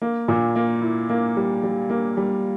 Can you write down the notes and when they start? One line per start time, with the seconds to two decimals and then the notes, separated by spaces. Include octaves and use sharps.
0.02 A#3
0.28 A#2
0.56 A#3
0.82 E4
1.10 A#3
1.37 G3
1.63 G3
1.90 A#3
2.17 G3